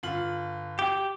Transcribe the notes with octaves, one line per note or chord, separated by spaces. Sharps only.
G1 F4 F#7
G4